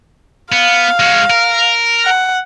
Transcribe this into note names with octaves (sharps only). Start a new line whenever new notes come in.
B3 F5
G#3 F#4
A#4
F#5